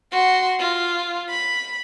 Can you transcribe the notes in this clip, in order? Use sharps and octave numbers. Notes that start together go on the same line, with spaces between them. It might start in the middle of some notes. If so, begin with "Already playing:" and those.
F#4 C6
F4
B5